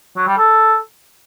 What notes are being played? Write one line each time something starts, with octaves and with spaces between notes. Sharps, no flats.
F#3
G3
A4